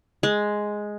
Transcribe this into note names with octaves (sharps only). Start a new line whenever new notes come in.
G#3